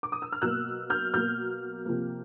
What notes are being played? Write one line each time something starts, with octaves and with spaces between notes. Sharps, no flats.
D6
D#6
E6
F6
B2 F#3 A#3 E6 F#6
F6 G6
B2 F#3 A#3 F6 G6
C3 F3 A#3